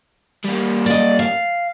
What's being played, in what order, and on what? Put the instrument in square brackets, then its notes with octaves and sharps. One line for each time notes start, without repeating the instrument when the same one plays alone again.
[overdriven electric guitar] G3 A#3
[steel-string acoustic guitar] D5 D#5
F5